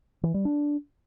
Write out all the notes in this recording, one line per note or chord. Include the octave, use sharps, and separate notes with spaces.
E3
G3
D4